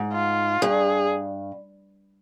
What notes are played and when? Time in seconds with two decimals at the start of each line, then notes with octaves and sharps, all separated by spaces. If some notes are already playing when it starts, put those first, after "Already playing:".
Already playing: G#2
0.13 F4
0.62 G2 G#4